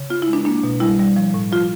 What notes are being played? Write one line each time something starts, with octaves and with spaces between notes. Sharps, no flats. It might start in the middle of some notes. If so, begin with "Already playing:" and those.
Already playing: C#3
B3 F4
E4
G#3
D4
A#3 D4
B2
G3 E4
G3
F3
A2
F3 F4